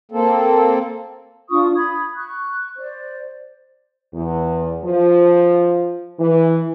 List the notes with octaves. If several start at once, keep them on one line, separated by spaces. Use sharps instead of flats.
A#3 C4 A4
D4 F4 C#6 D#6
B5 D#6 G#6
C#6 F#6
C5 D5
E2
F3
E3